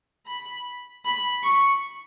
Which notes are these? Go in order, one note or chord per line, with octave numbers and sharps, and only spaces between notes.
B5
B5
C#6